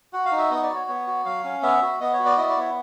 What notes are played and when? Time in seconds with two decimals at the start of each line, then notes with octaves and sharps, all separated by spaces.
0.13 F#4 F#5
0.26 F5
0.32 D#4
0.38 E5
0.51 B3 D#5
0.63 D5
0.69 F#4
0.75 C#5
0.88 B3 C#5
1.07 F#4
1.25 F#3 F5
1.44 C#4
1.63 B3 E5
1.82 F#4
2.00 B3 D#5
2.13 C#5
2.19 F#4
2.25 D5
2.37 E4 D#5
2.49 D5
2.57 B3 C#5